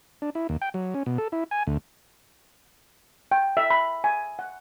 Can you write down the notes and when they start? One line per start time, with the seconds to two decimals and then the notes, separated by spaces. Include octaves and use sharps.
0.22 D4
0.35 E4
0.49 D#2
0.62 G5
0.74 F#3
0.94 C#4
1.06 B2
1.18 A4
1.32 E4
1.51 G#5
1.67 D2
3.32 G5
3.57 E5
3.71 B5
4.04 G#5
4.39 F#5